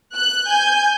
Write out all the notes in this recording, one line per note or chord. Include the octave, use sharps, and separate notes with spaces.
F#6
G#5 G6